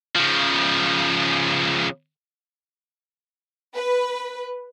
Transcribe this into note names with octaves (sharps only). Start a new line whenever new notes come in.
C#3 F3
B4